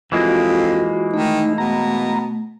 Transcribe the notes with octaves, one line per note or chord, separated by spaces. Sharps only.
F2 E3 G#3 A#3 F4 F#4
D#3 A3 D#4
B2 A#5